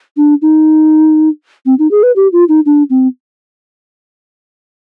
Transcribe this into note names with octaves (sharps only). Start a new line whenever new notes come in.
D4
D#4
C4
D#4
G#4
B4
G4
F4
D#4
D4
C4